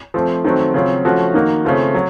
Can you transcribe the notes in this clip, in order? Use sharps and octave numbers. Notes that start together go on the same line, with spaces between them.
F3 A3 C4
D#3 F#3 A3 C4 F#4
C#3 F#3 C4 F4
F3 A3 C#4 F#4
D#3 A#3 D#4 F#4
C#3 A3 C4 F4
F#3